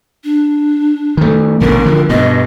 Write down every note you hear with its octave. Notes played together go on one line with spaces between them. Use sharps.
D4
D#3 A3
A1 B2 D3 A#4
D3 F3
G2 B2 D#5